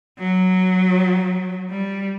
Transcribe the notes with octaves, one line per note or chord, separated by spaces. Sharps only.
F#3
G3